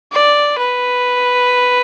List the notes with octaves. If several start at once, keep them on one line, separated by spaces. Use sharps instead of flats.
D5
B4